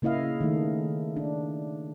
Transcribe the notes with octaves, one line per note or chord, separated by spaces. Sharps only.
C#3 A#3 E4 D#5 F5
D#3 A3
D4